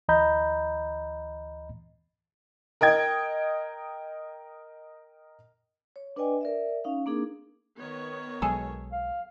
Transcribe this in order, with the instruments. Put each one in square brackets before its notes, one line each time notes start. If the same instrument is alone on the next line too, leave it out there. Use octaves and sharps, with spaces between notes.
[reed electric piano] D2 E3 D#5 A#5 B5 G6
[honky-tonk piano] A#4 D#5 G5 G#6
[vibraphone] C#5
D4 B4 D5 D#5 G5 G#5
A#4 D5 E5
C#4 D#4 F5
A#3 C4 D4 D#4 G#4 A#4
[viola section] D#3 B3 C#5
[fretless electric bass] B1 F#3 G#3 [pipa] G#4 A4
[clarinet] F5